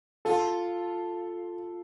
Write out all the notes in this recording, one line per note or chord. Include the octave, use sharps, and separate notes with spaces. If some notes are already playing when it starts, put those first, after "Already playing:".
F4 A4